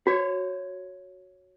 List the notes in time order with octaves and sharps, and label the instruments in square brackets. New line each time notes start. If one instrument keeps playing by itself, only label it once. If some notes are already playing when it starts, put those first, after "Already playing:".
[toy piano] F#4 [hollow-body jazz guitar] C5 C#5